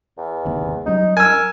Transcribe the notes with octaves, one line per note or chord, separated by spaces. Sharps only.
E2
G1 D#2 C3
F#3 G3 C#4 D#4
A#4 G#5 E6